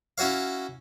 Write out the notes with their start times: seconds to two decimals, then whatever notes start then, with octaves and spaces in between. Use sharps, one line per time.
0.18 C#4 E4 F#4 C#5 F5